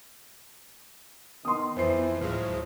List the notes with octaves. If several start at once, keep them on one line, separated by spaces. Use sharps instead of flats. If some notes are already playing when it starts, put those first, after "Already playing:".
D#3 B3 C6 D#6
F2 E3 F3 C5 C7
D2 A2 F3 F#3 G#3 F6